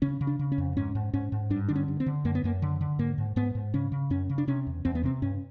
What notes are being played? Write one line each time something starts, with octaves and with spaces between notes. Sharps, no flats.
C#3 C#4
C#3
D4
C#3
C#4
F2
G#2 C#4
G#2
G#2 C#4
G#2
G2 D4
D3 D4
C#4
G2
C4
D3
F#2 A#3
B3
F#2 A#3
D3
D3
G#2 A#3
G#2
G#2 B3
G#2
C#3 C#4
C#3
F#2 C#4
C#3
D4
C3 C#4
E2
E2 C4
B3
C3 C4
G2 C#4